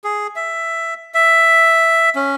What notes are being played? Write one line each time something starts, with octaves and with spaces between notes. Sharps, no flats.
G#4
E5
E5
C#4